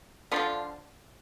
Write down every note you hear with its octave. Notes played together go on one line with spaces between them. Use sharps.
D3 F3 B3 D4 F4